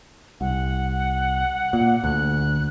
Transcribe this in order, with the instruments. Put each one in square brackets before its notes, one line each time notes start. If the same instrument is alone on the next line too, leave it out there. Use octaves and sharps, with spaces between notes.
[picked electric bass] C2 [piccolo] F#5
[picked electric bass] A#2
[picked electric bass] D2 [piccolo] F#6